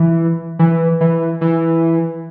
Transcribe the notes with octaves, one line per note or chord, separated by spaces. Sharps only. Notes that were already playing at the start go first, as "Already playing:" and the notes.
Already playing: E3
E3
E3
E3